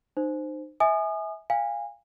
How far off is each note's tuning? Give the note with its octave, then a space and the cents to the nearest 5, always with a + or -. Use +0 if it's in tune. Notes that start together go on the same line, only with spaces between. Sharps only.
D#4 -35 C5 -5
E5 -25 G#5 +0 D#6 -35
F5 +0 G#5 -30